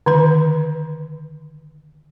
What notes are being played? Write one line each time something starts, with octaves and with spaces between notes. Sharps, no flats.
D3 D#3 B4